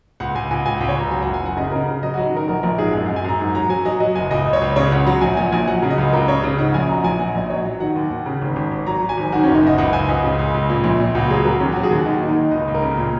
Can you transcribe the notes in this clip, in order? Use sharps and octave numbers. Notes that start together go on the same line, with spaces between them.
C#2 F#5
C#2 G#5
C#2 G#5
C#2 G#5
C#2 F#5
C#5
C#2 A#5
F#3 G#5
F#1 F#5
G#5
F#1 F#5
C#3 D#5
C#3 A#4
C#3
F#3 D#5
F#3 F#4
D#4
D#3 A#4
A#1 A#4
A#1 A#4
G#2 G#4
F#2 D#5
F#2 F#5
G#5
F#2 A#5
G#2
F#3 A#5
F#3 G#5
F#3 D#5
F#3 D#5
F#1 G#5
C#2 D#5
C#2
C#5
C#2
C#3 C#5
C#2 F#5
F#3 F#5
A#1 G#5
A#2 G#5
A#1 G#5
F#3 F#5
C#3
D#5
C#2
C#2 A#4
C#3 C#5
C#3 D#5
G#2 F#5
A#1 G#5
F#3 A#5
A#1 G#5
A#2 F#5
A#1 D#5
F#3 C#5
F#3
D#3 F#5
D#2
D#2
C#3
G#1
G#1
G#1
F#3 A#5
F#3
G#5
G#1
D#3 F#4
F#1 C#4
D#4
F#1 D#5
C#2 F#5
C#2 G#5
C#2 D#5
C#3
C#2
C#2
A#2
A#1
A#2
C#2 F#4
F#3 G#4
F#3 A#4
D#2 C#4
F#3 F#4
G#4
D#2 F#4
D#2 D#4
D#3
D#4
D#2
C#2 D#5
C#2
A#4
C#3
A#2